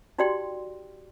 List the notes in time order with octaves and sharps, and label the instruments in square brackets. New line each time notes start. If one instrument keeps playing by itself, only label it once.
[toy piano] D#4 F#4 G4 D5 G5 C6